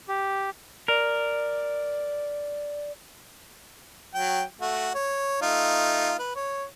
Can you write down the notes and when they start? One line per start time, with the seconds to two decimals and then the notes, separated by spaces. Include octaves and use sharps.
0.08 G4
0.88 A#4 D5
4.14 F#3 G5
4.61 A3 F#4
4.95 C#5
5.42 A3 D#4 F4
6.19 B4
6.36 C#5